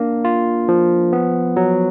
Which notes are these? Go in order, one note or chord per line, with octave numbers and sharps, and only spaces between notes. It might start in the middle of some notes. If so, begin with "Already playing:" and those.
Already playing: A#3 D4
F4
F3
B3
F#3